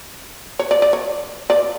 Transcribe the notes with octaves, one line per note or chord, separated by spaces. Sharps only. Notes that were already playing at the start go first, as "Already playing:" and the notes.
C#5
D5
D5
C#5
D5